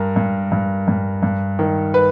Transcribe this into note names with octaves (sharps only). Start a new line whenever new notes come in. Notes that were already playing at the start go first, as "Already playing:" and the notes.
Already playing: G2 A#4
G2
G2
G2
G2
D#3
B4